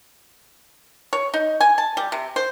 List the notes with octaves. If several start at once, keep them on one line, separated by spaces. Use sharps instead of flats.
C#5
D#4
G#5
A5
G3
C3
C5